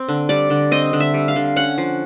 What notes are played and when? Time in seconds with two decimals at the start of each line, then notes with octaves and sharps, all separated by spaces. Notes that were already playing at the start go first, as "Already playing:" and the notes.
Already playing: C4
0.09 D3
0.29 G3 D5
0.50 D3
0.71 C4 D#5
0.93 D3
1.00 E5
1.14 G3
1.28 F5
1.36 D3
1.56 C#4 F#5
1.78 F3